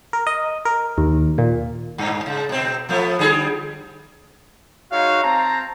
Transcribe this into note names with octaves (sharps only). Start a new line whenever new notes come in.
A#4
D#5
A#4
D#2
A#2
G2
C#3
B2 C4
F3 A3 B3
D3 G3 G#4
G#3 D#4 F#4 C#5 F5
C4 A5 A#5